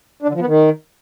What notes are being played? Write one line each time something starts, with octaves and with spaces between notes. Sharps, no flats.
D4
D3
F3
B3
D#3